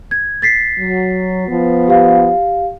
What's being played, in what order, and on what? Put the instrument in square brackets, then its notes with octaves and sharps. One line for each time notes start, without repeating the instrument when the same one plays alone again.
[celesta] G#6
A6 B6 C7
[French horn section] F#3
F3 B3
[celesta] G4 F5